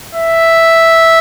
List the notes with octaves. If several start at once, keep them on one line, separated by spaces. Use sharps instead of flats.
E5